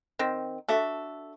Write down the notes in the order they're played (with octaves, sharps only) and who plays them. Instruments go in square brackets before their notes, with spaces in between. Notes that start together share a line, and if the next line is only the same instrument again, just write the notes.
[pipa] D#3 C4
[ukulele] D4 F#4 E5 [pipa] A4